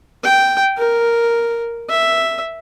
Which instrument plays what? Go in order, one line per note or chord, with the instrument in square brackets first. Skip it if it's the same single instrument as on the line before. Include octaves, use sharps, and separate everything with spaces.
[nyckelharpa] G5
A#4
E5